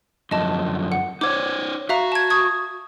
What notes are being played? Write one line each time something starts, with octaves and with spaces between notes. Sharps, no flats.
F#2 D3 F3 D#5 A5
F#5
D#4 C5 C#5 D6 G#6
F#4 E5 F5 A#5
A5 G#6
C#6 D#6 G#6